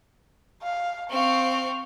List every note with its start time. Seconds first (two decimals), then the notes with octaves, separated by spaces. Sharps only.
0.63 F5
1.10 C4 F5 C#6